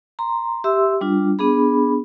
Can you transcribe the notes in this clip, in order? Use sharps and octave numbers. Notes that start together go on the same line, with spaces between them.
A#5 C6
G4 E5 C6 E6
G3 D4 F4
B3 D4 G#4 B5